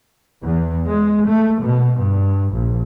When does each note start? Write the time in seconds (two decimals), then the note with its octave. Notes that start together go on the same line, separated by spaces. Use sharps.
0.43 E2
0.87 G#3
1.29 A3
1.63 B2
2.00 G2
2.54 A#1